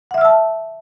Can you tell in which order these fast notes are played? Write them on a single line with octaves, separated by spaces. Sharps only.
F#5 E5 F6 E6 A5